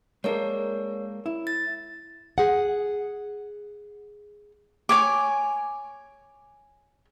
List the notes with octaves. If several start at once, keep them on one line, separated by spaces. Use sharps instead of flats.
G#3 A#3 D4 A#4 C#5
E4
A6
G#4 F#5
C#5 G#5 D6